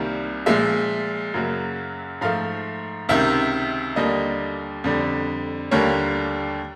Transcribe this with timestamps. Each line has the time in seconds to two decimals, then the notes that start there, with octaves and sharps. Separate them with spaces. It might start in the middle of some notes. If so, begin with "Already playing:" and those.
Already playing: C2 C3 D#3 G3 A#3
0.46 A#2 F3 G#3 E5
1.34 F#2 C#3 F#3 A#3
2.21 G#2 F3 A3 F5
3.09 C#2 C3 D#3 E5
3.96 D#2 D3 G3 A#3 D#5
4.84 F2 D3 G3
5.71 D#2 D3 G3 A#3 C#5